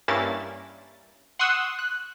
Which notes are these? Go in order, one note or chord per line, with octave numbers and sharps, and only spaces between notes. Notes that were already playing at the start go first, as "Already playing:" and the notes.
G2 A#3 C#4 E4 A6
F#5 C6 C#6 D#6 E6 F#6
F#6